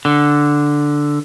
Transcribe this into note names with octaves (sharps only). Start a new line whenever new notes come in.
D3